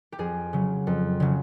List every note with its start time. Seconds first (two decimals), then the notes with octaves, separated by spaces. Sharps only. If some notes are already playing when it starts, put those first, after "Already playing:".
0.12 G4
0.18 F2 G#4
0.53 C#3 F#3
0.87 F2
1.20 C#3 F#3